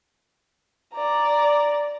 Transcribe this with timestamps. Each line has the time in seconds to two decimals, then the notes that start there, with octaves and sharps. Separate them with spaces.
0.95 D5 A#5